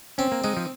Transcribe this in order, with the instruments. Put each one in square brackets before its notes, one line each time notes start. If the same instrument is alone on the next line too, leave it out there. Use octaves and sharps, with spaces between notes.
[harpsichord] C4 [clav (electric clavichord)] C#4
[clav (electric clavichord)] A#3
[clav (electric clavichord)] G#3 [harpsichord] D#4
[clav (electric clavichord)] F3